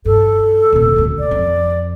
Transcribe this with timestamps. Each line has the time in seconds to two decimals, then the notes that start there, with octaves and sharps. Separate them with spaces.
0.05 G2 A4
0.72 D#1 C3
0.96 D#1 D2
1.19 D5
1.31 F2